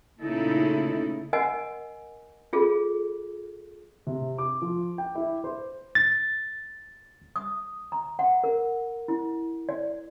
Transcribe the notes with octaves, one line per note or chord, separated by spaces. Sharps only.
A#2 C#3 A3 D#4 E4 A4
A#4 D#5 F#5 G#5
F4 G#4 A4
C3
D6
F3
G5
E4
C5
A6
D#6
A#5
F#5
A#4
E4
D5